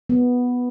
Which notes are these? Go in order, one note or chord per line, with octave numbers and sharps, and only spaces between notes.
B3